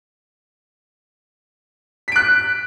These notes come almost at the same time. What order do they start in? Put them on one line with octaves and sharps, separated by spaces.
B6 D7 F#6